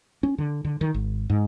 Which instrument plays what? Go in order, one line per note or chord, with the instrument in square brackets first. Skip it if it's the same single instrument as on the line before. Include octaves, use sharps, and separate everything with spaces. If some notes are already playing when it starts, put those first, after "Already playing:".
[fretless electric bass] C#4
D3
D3
D#3
G#1
G#2